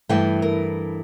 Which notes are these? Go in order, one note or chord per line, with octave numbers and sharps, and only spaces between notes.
G2 E3 A3 G5
A#4